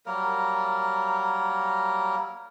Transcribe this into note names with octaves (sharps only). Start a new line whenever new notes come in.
F#3 G3 A#3 A#4